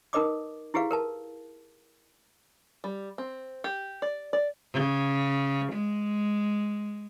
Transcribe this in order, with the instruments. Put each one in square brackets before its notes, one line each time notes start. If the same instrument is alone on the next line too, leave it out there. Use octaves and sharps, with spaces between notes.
[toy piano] D#4 A#4 B4 D#5 D6 D#6
E4 G4 G#4 B4 F5
A#4 B4 A5
[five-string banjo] G3
C4
G4
D5
D5
[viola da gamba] C#3
G#3